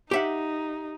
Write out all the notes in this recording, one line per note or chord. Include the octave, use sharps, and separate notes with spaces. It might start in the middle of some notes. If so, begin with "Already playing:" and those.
D#4 G4 E5 F#5